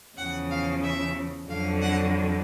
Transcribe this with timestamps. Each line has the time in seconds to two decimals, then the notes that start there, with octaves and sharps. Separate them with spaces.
0.17 E2 C#3 F3 F#5
0.50 F5
0.83 E5
1.49 F2 D3 F#3 F5
1.81 F#5